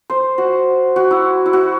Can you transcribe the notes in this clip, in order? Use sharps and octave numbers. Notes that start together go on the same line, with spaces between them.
C5
F#4
F#4
E4
E4
F#4